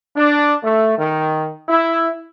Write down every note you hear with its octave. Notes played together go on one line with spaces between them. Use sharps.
D4
A3
D#3
E4